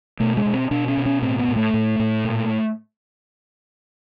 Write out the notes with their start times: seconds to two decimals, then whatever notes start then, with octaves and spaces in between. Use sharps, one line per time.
0.20 B2 A3
0.37 G#3
0.46 B2
0.53 C4
0.71 B2 D4
0.88 C#4
0.97 B2
1.06 C#4
1.22 A2 C4
1.39 B3
1.48 A2
1.56 A3
1.74 A2
1.99 A2
2.25 A#2